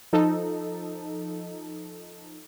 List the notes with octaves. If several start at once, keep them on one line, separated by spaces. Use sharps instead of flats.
F3 D#4 A4